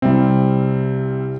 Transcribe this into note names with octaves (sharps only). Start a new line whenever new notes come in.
C2 C3 G3 C4